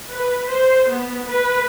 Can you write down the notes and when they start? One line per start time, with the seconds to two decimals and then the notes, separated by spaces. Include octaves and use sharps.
0.12 B4
0.50 C5
0.91 B3
1.28 B4